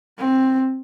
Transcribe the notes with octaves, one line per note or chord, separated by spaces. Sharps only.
C4